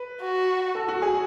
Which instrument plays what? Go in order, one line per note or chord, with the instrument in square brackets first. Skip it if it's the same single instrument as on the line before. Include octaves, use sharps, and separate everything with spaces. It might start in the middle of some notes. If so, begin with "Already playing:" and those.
Already playing: [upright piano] B4
[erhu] F#4
[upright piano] A4
F#4
G#4